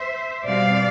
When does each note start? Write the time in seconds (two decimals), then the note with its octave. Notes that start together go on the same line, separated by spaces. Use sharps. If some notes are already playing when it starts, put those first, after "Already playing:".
Already playing: C5 E5
0.47 B2 G3 C4 D5 F5